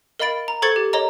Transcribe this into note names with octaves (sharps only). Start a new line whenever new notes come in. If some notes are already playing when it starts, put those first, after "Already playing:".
A#4 D#5 F5 B5 A6 D7
A#5
A4 C5 C#6 G#6 A6 C#7
G4
A#4 C#5 D#5 A#5